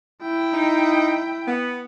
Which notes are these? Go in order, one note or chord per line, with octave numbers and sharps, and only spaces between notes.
E4 G5
D#4
B3